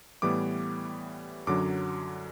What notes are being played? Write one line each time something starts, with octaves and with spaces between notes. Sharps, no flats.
A2 E3 G3 B3 D6
F#2 D3 F#3 D6